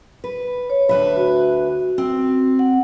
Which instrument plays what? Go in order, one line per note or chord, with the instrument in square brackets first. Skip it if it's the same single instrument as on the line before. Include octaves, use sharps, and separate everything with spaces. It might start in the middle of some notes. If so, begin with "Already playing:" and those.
[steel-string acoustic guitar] B4
[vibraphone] C#5
[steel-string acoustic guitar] D2 B4 E5
[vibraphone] F#4
[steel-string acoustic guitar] C4
[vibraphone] F#5